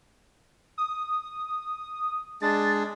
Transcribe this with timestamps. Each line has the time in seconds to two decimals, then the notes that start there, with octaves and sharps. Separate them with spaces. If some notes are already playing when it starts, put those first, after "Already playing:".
0.78 D#6
2.42 G#3 D4 G#4 A6